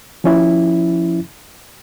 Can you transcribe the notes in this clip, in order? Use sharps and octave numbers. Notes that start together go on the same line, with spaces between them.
F3 C#4 E4